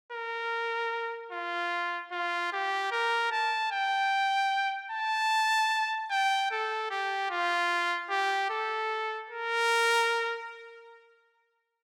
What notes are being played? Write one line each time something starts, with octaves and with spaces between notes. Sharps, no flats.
A#4
F4
F4
G4
A#4
A5
G5
A5
G5
A4
G4
F4
G4
A4
A#4